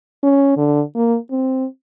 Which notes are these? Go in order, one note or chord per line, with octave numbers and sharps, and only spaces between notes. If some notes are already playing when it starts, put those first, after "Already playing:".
C#4
D3
A#3
C4